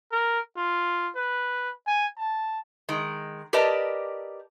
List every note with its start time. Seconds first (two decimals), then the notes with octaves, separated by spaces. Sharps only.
0.12 A#4
0.57 F4
1.16 B4
1.87 G#5
2.18 A5
2.89 D#3 G#3
3.53 G4 A#4 B4 D5 D#5 A5